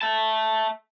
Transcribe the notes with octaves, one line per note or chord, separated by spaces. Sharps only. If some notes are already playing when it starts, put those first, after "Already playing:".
E5 A5